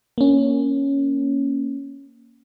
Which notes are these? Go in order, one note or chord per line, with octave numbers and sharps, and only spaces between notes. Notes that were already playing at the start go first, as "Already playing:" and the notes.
A#3 C#4